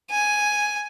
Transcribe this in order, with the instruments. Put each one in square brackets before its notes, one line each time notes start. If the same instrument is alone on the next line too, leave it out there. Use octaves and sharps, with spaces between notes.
[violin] G#5